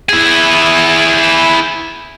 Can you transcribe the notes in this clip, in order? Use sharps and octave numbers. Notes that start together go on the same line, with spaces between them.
E4 G#4